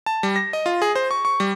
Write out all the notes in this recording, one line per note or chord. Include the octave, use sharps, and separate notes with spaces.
A5
G3
A#6
D#5
F4
G#4
C5
C#6
C#6
G3